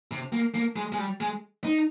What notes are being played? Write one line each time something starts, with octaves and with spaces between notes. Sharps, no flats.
C3
A#3
A#3
G#3
G#3
G3
G#3
D#4